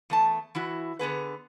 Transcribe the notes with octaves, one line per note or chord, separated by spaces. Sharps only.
E2 A3 A5
E3 E4 F#4
D3 B3 G#4 B4